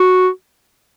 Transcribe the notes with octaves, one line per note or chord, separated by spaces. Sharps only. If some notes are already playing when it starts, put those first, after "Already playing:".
Already playing: F#4